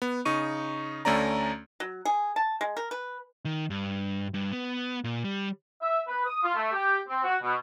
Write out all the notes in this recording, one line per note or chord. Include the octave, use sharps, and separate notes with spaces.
B3
C#3 D#4 C#6 D#7
D2 A3 C#4 D5 A#5
F#3
G#4
A5
G#3
A#4
B4
D#3
G2
G2
B3
A#2
G3
E5
B4
D#6
F4
A3
G4
C4
F#4
B2